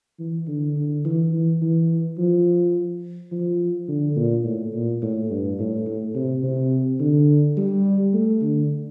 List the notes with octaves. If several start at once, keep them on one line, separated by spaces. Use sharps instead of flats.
E3
D3
D3
E3
E3
E3
F3
F3
D3
A#2
A2
A#2
A2
G2
A2
A2
C3
C3
D3
G3
A3
D3